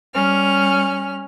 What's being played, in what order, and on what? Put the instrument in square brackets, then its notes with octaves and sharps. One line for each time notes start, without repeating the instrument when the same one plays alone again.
[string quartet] G3 C#4 F6